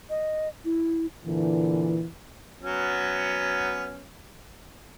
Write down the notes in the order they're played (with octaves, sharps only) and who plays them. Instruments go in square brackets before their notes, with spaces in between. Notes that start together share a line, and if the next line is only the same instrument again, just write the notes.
[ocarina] D#5
E4
[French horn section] A#2 D3 E3
[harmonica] F#3 B3 C#4